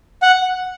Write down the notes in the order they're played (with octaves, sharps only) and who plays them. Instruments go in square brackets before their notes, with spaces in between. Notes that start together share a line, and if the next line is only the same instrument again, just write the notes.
[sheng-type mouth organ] F#5